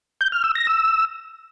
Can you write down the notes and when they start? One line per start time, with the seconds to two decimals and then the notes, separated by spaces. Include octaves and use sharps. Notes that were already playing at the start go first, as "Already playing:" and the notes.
0.21 G6
0.32 F6
0.44 E6
0.55 A#6
0.67 E6